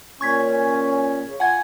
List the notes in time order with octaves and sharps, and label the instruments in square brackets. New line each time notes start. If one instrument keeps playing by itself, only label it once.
[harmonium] A#2 C#4 [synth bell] C#6 G#6 B6
[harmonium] C#3
[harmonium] F4 [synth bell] F#5 G#5 G#6